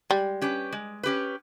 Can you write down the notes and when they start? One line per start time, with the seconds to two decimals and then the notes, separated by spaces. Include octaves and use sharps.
0.10 G3 G#3
0.42 C#4 G4 B4
0.72 G#3
1.03 C#4 G4 B4